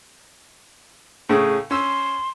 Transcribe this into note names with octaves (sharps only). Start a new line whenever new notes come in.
A2 C#3 G#4
C#4 C6 E6